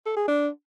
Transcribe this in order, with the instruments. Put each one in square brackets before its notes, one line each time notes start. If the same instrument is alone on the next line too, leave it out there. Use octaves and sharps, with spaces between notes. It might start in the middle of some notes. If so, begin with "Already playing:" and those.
[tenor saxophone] A4
G#4
D4